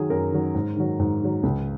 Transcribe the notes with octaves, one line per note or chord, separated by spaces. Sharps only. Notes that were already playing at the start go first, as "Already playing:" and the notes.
Already playing: D#3 F#3 G#4
F#2 A#4
D#3 F#3
G#2
D#3 F#3
G#2
D#3 F#3
C#2